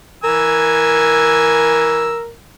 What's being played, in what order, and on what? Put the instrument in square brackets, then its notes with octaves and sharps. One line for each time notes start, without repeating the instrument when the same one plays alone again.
[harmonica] E3 G#5 E6 [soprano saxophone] A#4